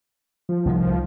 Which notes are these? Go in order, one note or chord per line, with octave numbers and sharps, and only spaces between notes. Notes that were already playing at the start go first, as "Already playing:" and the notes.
F3
C2 D#3